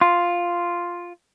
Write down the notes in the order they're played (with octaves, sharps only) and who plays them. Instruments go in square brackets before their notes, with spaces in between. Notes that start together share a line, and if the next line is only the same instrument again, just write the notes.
[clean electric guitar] F4